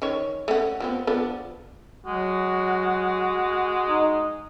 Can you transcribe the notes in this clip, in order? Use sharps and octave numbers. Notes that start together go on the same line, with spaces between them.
D#3 C#4 C#5
A3 C#4 F#5
F3 B3 C4
F3 B3 D4
F#3 G#3 F#4
D#4